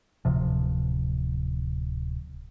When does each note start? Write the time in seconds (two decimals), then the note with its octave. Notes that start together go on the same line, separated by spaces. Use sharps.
0.25 D1 C3 F3